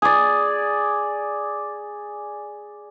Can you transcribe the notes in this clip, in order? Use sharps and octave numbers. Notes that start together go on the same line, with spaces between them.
G#4 D5